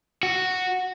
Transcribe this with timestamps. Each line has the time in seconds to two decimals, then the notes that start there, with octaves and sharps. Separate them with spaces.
0.23 F#4